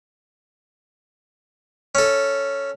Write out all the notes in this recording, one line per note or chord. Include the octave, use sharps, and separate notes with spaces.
C#4 A4